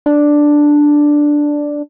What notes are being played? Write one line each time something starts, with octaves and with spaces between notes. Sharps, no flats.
D4